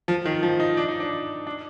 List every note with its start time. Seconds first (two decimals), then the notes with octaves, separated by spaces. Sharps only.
0.08 F3
0.26 D#3
0.43 F3
0.60 D#4
0.77 D4
0.88 D#4
1.00 D4
1.47 D4